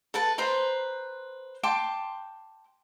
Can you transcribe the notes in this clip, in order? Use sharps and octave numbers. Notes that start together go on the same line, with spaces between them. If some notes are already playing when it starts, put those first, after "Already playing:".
A4 B4 A5
B4 C5 A#5 C6
G5 A5 C6 D6